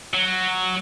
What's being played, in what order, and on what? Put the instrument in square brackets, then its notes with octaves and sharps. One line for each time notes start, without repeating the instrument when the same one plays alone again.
[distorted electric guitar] F#3